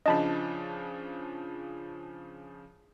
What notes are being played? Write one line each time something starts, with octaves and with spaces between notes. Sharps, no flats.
C#3 F3 D4 D#5 A5 B5